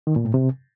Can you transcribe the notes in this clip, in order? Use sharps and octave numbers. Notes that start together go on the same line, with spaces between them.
D#3
A#2
A2
C3